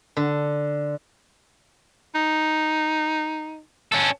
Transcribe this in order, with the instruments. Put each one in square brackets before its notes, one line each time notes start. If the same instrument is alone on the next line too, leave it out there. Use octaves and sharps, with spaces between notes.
[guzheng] D3
[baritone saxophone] D#4
[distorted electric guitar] C#4 A4